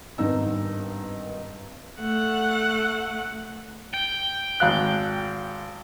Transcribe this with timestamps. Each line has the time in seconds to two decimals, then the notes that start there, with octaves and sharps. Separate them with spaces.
0.18 G#1 G2 B3 D#4 E6
2.00 A3 F#5
3.94 G5
4.60 G#1 F5 F#6